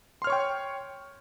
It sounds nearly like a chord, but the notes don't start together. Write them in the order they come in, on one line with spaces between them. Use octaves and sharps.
C6 F6 C#5 C#6 G5